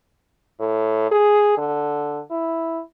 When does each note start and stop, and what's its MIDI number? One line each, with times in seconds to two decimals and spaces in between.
0.60 1.11 45
1.11 1.55 68
1.58 2.20 50
2.31 2.81 64